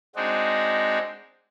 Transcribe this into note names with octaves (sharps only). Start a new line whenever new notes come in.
G#3 C4 D4 D#4 F#4